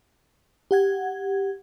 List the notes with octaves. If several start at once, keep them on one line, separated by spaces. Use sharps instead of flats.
G4 F#5 G#6